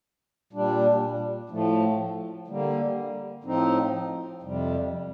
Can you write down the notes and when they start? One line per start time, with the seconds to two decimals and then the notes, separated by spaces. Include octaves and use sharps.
0.53 A#2 G3 D4
1.49 A2 F3 A3
2.48 D3 G3 A#3
3.44 A2 F3 C4 D#4
4.42 F2 C3 G3